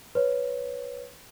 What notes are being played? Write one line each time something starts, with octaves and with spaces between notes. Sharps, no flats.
B4 C#5